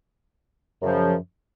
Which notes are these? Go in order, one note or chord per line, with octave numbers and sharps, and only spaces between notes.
F#2 C#3 F3